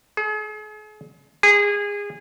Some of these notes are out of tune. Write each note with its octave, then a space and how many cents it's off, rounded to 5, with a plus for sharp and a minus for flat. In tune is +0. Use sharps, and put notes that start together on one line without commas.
G#4 +40
G#4 -25